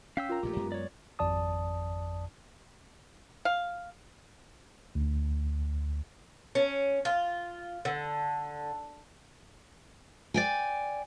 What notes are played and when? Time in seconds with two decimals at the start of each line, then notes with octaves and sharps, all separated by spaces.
0.17 C#4 F5 G5 E6 B6
0.29 F4 A#4 A#5
0.43 A#1 G#2 A3 G4
0.56 F#2 G#3 B3
0.72 C#5 D5
1.19 G#1 F2 D5 A5 D#6
3.45 F5
4.95 D2
6.55 C#4
7.05 F4
7.85 D3
10.34 D5 G5 G#5